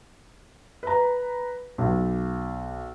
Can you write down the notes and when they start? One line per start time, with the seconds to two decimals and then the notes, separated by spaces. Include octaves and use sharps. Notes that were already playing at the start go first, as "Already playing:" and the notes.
0.83 B4 A#5
1.78 B1